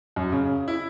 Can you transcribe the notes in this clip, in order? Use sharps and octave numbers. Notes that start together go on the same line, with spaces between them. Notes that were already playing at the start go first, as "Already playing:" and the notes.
F#2
C#3
E4